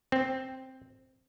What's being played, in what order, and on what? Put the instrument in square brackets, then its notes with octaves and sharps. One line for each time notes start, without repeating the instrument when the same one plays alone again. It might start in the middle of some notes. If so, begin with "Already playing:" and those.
[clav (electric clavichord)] C4